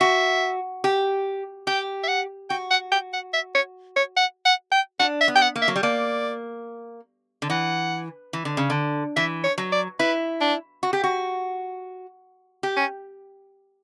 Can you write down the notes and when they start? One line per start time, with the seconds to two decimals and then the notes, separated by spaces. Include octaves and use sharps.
0.01 F#4 E5
0.84 G4
1.67 G4 G5
2.03 E5
2.08 F#5
2.50 F#4 G5
2.71 F#5
2.92 G5
3.13 F#5
3.34 E5
3.55 C#5
3.96 C#5
4.17 F#5
4.45 F#5
4.72 G5
4.99 D4 F#5
5.21 E5
5.28 B3
5.36 G5
5.42 F#5
5.56 A#3
5.62 E5
5.68 F#3
5.76 G3
5.83 A#3 D5
7.42 D3
7.50 E3 F#5
8.33 E3
8.45 D3
8.57 C#3
8.70 D3
9.16 E3 E5
9.44 C#5
9.58 F#3
9.72 D5
9.99 E4 B4
10.41 D4
10.83 F#4
10.93 G4
11.04 F#4
12.63 G4
12.76 C#4